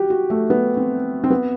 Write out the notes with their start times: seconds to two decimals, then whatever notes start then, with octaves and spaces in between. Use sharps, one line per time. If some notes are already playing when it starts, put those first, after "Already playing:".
Already playing: F#4 G4
0.10 F#4
0.30 A3
0.50 B3
0.77 C4
1.24 C4
1.30 B3